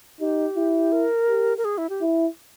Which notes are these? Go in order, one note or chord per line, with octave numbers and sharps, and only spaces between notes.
D#4 G4
E4
A#4
G4
A#4
G#4
E4
G4
E4